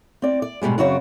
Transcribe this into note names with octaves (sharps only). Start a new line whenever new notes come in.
C4 D5
D5
G#2 B2 F3 G3 G#3
F#2 C#3 C4 F#4 C#5 D5